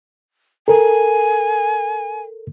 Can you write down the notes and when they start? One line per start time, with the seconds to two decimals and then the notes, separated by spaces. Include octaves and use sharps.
0.68 A4 A#4 G#5